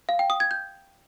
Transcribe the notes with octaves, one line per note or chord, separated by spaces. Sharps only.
F5
G5
D#6
G#6
G6